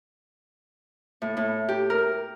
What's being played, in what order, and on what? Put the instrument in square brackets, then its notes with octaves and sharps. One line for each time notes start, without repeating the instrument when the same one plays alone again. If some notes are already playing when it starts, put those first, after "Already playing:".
[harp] A2
A2
G4
A#4